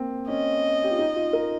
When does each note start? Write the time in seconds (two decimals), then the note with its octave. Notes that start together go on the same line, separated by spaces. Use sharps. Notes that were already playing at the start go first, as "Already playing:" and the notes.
Already playing: A#3 C4
0.28 C#4 D#5
0.84 G4
0.91 F4
0.98 D#4
1.16 F4
1.33 A#4